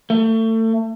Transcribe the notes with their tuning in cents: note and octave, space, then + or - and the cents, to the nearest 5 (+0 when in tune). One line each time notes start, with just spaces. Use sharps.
A3 +30